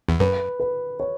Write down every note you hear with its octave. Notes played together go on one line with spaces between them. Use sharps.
E2
F#2 B4
B4
C#5